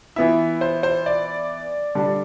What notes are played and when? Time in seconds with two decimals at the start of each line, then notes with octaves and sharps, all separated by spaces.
0.16 E3 B3 E4 E5
0.61 C5
0.83 C5
1.06 D5
1.95 D3 G3 D4